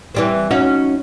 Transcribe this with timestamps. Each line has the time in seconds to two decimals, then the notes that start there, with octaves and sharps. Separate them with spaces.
0.15 E3 G3 C4
0.51 C#4 D#4 F#4